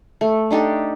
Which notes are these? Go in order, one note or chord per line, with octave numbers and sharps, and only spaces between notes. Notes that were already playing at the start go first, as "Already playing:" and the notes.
A3
D4 D#4 G4 A4